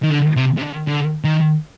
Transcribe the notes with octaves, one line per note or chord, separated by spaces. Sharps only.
D#3
D3
C3
C3
D3
D3
D#3